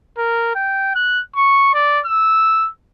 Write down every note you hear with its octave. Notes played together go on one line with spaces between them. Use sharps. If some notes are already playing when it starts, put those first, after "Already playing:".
A#4
G5
F#6
C#6
D5
E6